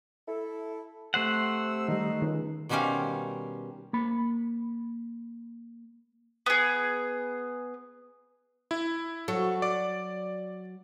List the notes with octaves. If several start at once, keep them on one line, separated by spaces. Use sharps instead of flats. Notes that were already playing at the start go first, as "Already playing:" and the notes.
E4 A4
C3 A3 C5 F#5 E6
D#3 G3 D#4
C#2 D#3
B2 D#3 G3 C#4 C5 F5
A#3 B5
B3 G#4
E4
F#3 F#4 A4
D5 D6